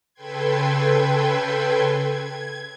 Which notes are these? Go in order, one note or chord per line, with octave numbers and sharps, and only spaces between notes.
C#3 A4 B4 G5 C6 G#6
G#6